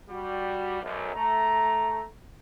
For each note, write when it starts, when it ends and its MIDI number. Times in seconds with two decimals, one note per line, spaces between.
0.10 0.78 55
0.10 0.78 66
0.82 1.13 35
0.82 1.13 42
1.15 2.03 57
1.15 2.03 82